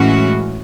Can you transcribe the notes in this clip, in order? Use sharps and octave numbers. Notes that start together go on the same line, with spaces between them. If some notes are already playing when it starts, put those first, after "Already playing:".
Already playing: A2 E3 G#3 C#4 F#4